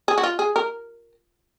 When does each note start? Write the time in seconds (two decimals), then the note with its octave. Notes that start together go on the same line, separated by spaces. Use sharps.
0.08 G#4
0.18 F#4
0.23 F4
0.39 G#4
0.56 A#4